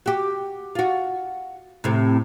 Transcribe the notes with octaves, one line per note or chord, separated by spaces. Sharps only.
F#4 G4
F4 F#4
A2 C3